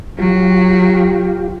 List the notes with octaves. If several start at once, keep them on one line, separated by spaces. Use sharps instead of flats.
F#3 F4 G4